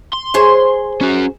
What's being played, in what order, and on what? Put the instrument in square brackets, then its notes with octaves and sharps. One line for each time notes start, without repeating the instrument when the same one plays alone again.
[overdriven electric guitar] C6
[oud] G#4 C5 C#5
[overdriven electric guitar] C#4 F#4